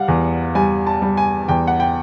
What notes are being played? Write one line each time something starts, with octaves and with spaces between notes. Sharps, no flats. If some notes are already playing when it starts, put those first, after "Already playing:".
Already playing: G3 F5 F#5
E2
G3 G#5
A5
G3
G#5
E2 G5
F#5
G5